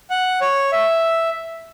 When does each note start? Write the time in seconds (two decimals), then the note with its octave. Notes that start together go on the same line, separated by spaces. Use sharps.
0.10 F#5
0.41 C#5
0.72 E5